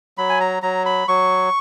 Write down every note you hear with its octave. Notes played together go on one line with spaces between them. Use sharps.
F#3 B5
G#5
A#5
F#3 A#5
B5
F#3 C#6